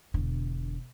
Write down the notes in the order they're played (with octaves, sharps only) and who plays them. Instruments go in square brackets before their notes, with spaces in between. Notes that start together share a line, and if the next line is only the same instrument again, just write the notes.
[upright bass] E1 D3